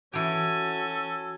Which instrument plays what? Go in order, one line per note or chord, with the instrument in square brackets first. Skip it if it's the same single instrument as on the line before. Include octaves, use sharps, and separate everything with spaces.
[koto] E3 G4 [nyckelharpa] C#4 G#5 [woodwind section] F#4 A4